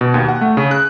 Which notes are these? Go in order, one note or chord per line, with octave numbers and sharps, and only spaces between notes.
B2
D#2
F#5
A3
C#3
F#6